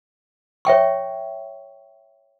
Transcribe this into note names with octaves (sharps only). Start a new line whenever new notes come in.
C#5 E5 G5 C#6